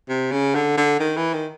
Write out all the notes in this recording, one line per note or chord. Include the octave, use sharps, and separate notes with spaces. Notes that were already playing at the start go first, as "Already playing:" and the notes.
C3
C#3
D3
D3
D#3
E3
D#3